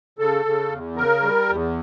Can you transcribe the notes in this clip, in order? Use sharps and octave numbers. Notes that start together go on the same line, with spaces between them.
C#3 A4
C#3
E2
C#3 A#4
G3
E2